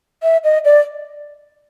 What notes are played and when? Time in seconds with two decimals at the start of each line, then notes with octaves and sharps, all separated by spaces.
0.23 E5
0.44 D#5
0.65 D5